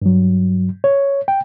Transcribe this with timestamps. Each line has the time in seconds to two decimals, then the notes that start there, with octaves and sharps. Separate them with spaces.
0.02 G2 F#3
0.84 C#5
1.28 G5